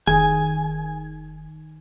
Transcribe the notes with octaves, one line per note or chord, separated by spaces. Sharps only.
F1 D#3 G#4 G#5